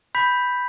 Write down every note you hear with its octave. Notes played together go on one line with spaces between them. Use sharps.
B5 G6 B6